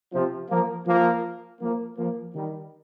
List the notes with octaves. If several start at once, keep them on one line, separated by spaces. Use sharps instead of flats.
C3 F3
F3 A#3
F3 A#3
F3 A#3
F3 A#3
D#3 G3